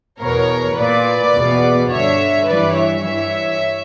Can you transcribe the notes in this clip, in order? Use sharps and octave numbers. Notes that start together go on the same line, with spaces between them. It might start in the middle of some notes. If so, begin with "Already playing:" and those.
E2 B2 A#4 C#5
A#2 B4 D5
E2 B2
G2 D3 C#5 E5
G2 E3 B4 D5
C#5 E5
G2 E3